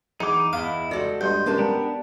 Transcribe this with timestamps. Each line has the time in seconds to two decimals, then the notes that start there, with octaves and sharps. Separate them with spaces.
0.20 E2 D#4 D6
0.53 E2 E4 D#5 F5
0.91 G3 G#3 F#4 A4 D5
1.21 G2 B3 D#5 C6 G6
1.46 G#3 A#3 C#4 B4 D5 A5
1.59 B3 D4 G4 A#4